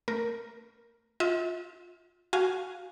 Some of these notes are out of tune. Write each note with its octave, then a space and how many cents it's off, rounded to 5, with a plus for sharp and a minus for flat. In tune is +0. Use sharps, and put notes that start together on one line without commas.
A3 +30 A#4 +0
F4 +20 E5 -40
F#4 +0 F5 +0 G#5 +0